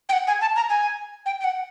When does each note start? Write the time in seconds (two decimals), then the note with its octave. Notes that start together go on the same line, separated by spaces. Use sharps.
0.09 G5
0.13 F#5
0.27 G#5
0.41 A5
0.56 A#5
0.70 G#5
1.26 G5
1.40 G5
1.44 F#5